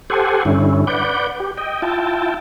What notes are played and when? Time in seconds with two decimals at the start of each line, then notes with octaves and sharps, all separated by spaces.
0.10 G4 A4 C5 F#5 G#5
0.45 G2 D3 C#4 E4
0.87 B4 D5 F#5 G6
1.40 G4
1.57 D#5 G5
1.82 E4 F4 G5 A5